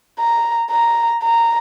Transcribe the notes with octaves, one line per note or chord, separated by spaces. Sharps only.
A#5
A#5
A#5